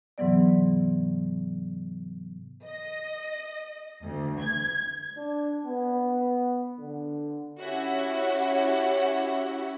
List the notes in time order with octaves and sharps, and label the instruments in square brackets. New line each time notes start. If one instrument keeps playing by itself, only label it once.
[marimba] G#2 C3 E3 F#3 B3 D5
[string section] D#5
D2
G#6
[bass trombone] D4
B3
D3
[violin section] C#4 E4 F#4 G4 E5 F#5